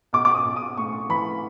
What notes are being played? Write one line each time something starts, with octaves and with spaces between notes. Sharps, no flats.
B1 D6
D6
D#6
B1
D#6
A2 C#6
E3 B5